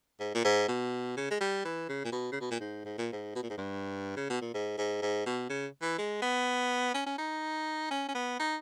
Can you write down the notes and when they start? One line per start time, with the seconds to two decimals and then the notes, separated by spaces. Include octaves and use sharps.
0.20 G#2
0.35 A#2
0.44 G#2
0.68 B2
1.17 C#3
1.30 G#3
1.40 G3
1.65 E3
1.89 C#3
2.05 A#2
2.12 B2
2.32 C#3
2.41 B2
2.51 A#2
2.60 G#2
2.85 G#2
2.98 A#2
3.12 G#2
3.35 B2
3.43 A#2
3.50 G#2
3.58 G2
4.17 C#3
4.30 B2
4.41 A#2
4.54 G#2
4.78 G#2
5.02 G#2
5.26 B2
5.50 C#3
5.82 E3
5.98 G#3
6.22 B3
6.94 C#4
7.06 C#4
7.18 D#4
7.90 C#4
8.08 C#4
8.14 B3
8.39 D#4